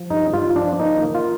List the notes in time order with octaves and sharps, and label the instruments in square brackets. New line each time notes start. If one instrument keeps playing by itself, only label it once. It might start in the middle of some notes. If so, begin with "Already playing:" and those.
Already playing: [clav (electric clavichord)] F3
G2 D#4
G2 F4
F3 D4
A#3 D#4
A#3
F4